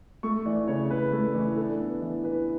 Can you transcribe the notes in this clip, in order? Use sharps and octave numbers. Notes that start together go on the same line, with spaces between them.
A3 C#6
E3 D5
C#3 C#5
C#3 B4
A3
E3
D4 A4
B3
E3
E3 B4